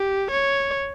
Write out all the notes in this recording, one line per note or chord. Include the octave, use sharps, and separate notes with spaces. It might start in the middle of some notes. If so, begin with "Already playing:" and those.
Already playing: G4
C#5